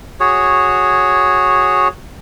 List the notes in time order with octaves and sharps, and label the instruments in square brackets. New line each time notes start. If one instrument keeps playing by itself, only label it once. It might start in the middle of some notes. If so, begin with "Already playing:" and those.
[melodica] F#4 G#4 C#5